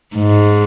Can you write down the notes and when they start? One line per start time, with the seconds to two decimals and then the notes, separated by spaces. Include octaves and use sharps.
0.16 G#2